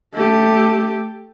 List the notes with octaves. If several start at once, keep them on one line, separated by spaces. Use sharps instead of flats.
A3 G4